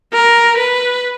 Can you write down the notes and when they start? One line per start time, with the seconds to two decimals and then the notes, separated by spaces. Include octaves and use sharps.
0.13 A#4
0.57 B4